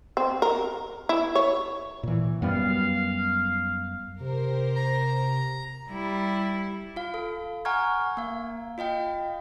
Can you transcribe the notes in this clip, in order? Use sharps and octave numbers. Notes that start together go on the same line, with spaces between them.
C4
A#4
E4
C#5
A#2 E3
F#2 G3 B3 F5
C3 G4 A#4 C5
A#5
G3 E4
F4 F5
A4
F#5 G#5 A#5 C#6 F6 G#6
A#3 F5
F4 D#5 F5 G5